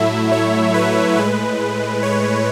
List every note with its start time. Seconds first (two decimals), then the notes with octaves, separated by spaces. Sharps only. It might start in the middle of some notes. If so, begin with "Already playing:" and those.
Already playing: A2 F#3 A3 E4 E5
0.32 C#5
0.74 B4
1.17 A2 G#3 B4
2.03 C#5